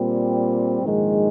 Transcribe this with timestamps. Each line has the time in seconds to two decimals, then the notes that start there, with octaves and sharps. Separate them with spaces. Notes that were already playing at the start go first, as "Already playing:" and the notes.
Already playing: A#2 G3 C4
0.82 A#1 G#2 D#3 G#3